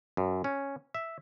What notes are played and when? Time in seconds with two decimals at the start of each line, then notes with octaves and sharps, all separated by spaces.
0.17 F#2
0.44 C#4
0.95 E5